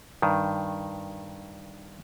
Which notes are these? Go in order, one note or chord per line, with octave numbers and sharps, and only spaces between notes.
G2 D#3